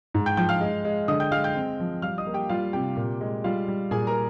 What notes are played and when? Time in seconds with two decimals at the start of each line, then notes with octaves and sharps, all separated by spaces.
0.14 G#2
0.26 G5 G6
0.37 F3 G5 G6
0.49 F5 F6
0.61 G#3
0.85 G#3
1.08 D3 D#5 D#6
1.20 G5 G6
1.32 G#3 F5 F6
1.44 G5 G6
1.55 C4
1.80 F3
2.02 G3 F5 F6
2.18 D#5 D#6
2.27 A#3
2.34 G4 G5
2.49 G3 F4 F5
2.73 C3 G4 G5
2.97 A#2
3.21 G#3
3.44 G3 F4 F5
3.68 G3
3.91 A#2 G#4 G#5
4.07 A#4 A#5